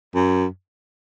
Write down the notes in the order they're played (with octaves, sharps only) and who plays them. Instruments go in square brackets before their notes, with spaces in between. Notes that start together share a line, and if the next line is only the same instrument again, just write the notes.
[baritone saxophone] F#2